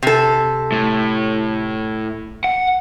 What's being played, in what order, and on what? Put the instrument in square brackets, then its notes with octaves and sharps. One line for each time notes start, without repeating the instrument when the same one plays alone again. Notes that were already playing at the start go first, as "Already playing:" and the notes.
[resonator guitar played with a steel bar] C3 A4
[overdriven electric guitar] A2
F#5